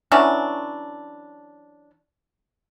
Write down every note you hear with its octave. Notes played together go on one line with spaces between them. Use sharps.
E3 F#3 C#4 D4